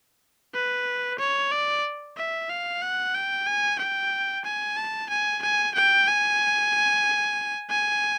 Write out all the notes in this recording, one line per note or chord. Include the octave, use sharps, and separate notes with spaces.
B4
C#5
D5
E5
F5
F#5
G5
G#5
G5
G#5
A5
G#5
G#5
G5
G#5
G#5